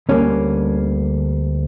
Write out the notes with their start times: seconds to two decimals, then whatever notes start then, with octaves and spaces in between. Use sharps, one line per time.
0.09 D2 D3 G3 A#3 C#4